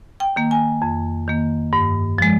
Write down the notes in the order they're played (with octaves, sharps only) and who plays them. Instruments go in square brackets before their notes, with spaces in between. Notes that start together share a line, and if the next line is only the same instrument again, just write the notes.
[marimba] G5
D#3 A#3
G#5
F2
D#3 A#3
G2
F3 G#3